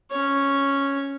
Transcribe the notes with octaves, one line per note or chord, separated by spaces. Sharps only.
C#4 C#5